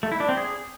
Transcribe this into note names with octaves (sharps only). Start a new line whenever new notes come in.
A3
E4
D4
C4
G#4